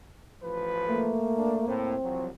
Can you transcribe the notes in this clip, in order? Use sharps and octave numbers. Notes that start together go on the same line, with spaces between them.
A1 F3 B4
A3 A#3
D4
A2 C4
C2 F3 F#3